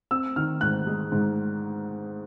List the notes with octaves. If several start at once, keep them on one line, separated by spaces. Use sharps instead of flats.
C4 E6
D#3 F6
G#2 F#6
G#3
G#2